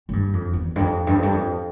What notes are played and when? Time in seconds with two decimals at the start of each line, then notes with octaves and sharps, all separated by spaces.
0.09 A2
0.13 G2
0.33 F2
0.53 E2
0.76 G2
0.80 F2
1.07 G2
1.15 F2
1.23 G2
1.34 F2